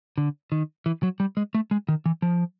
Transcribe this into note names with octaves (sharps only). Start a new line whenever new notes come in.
D3
D#3
E3
F#3
G3
G#3
A3
G#3
D#3
E3
F3